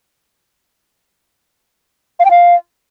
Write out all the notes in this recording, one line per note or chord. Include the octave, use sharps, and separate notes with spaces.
F5
G5
F5